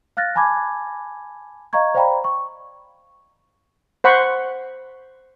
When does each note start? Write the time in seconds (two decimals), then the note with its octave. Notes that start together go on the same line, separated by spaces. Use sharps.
0.17 F5 F6 F#6 A6 A#6
0.35 G#5 A5 B5 D6 G#6
1.73 D#5 F5 A#5 C#6 G#6
1.95 C5 D5 F5 G5 A#5 B5
2.24 C#6
4.04 C5 F#5 B5 C#6